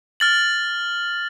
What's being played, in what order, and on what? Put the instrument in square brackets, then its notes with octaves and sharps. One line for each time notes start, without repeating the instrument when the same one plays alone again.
[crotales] F6 A6 F#7